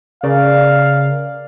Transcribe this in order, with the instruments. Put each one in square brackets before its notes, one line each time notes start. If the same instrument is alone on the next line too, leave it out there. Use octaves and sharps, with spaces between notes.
[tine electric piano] C#3 A#4 [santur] D5 [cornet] F5